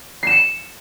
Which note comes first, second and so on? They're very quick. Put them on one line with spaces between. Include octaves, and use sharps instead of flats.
C7 E7 C#7